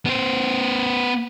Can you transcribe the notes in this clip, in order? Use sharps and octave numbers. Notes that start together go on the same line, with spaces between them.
B3 C5